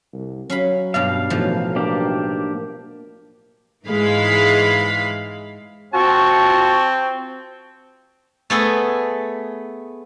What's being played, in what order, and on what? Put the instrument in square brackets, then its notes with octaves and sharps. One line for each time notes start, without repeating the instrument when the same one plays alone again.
[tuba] C2
[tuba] F#3 [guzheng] C#4 F5 B5
[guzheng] G2 B2 D5 [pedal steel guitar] F5
[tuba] B1 [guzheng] A2 E3 F3
[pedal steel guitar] A#3 D4 G4
[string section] G#2 E3 G#3 F5 B5
[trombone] C4 [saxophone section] F4 F#4 [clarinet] A5 [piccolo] C#6
[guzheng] A3 B3 G#4 A4